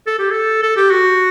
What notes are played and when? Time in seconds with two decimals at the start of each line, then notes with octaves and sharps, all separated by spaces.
0.07 A4
0.19 G4
0.30 A4
0.63 A4
0.77 G4
0.91 F#4